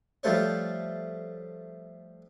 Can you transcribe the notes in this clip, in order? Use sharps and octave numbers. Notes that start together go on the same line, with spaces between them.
F3 G3 A3 C5 C#5